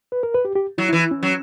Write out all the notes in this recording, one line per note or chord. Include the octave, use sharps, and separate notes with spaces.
B4
A#4
B4
G4
G4
F#3 E4
E4
E3
E4
C#4
F#3